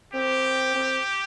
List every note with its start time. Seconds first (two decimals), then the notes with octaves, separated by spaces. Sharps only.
0.13 C4 G4
0.75 C4